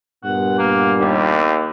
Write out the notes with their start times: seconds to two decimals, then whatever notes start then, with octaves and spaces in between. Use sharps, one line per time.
0.24 G2 A#2 B3 F#5
0.59 A#3
1.00 D#2 G3